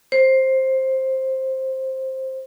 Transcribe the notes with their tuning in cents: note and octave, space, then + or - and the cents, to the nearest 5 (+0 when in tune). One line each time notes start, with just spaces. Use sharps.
C5 +10